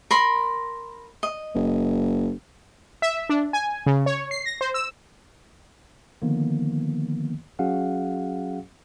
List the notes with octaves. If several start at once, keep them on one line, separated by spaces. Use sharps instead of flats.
A#4 B5 C6
D#5
F#1
E5
D4
G#5
C#3
C#5
C7
A#6
C5
E6
D3 D#3 F3 A#3 B3
F#3 C#4 F#4 G#4 F5 F#5